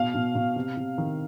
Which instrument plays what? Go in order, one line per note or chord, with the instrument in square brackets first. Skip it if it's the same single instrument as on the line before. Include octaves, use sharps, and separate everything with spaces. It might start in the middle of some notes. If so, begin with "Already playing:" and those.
Already playing: [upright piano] B2 F5
B2
B2
C3
C3
D#3